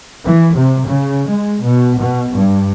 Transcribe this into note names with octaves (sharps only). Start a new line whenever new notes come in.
E3
C3
C#3
G#3
B2
B2
G2